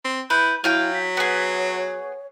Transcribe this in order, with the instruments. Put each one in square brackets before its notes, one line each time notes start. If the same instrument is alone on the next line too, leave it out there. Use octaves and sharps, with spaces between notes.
[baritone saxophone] C4
[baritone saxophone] E4 [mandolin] B4 [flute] G6
[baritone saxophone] F#3 [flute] E4 [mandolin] F5 G5 G#5
[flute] B6
[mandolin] B3 G#4
[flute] C#5